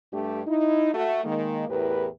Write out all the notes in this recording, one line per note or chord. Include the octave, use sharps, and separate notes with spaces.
G2 A3 D4 G4
D#4 E4
A3 F#4
D#3 G#3 A#3
E2 A2 G4 A#4 B4